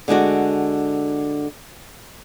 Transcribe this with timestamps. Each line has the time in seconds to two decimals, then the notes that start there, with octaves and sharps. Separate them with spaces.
0.08 D3 G#3 D4 F#4